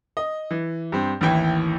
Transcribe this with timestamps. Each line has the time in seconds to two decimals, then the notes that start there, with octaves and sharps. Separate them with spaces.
0.17 D#5
0.51 E3
0.92 G2 C4
1.21 A1 D#2 E3 E4 G5